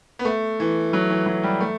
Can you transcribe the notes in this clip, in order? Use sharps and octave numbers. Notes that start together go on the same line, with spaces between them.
B3
A3
E3
F#3
E3
F#3
G3
A3